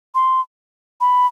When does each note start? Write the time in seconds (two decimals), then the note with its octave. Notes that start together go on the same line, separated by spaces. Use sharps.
0.15 C6
1.01 B5